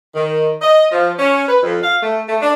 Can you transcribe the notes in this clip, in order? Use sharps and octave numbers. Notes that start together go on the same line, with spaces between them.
D#3
D#5
F3
C#4
B4
F2
F5
A3
A3
D4